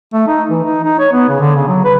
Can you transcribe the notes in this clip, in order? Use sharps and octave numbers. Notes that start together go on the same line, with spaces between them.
A3
D#4
E3
D#4
D#4
C#5
B3
C#3
D3
C#3
F#3
B4